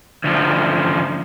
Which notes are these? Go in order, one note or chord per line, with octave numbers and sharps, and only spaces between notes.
D2 F3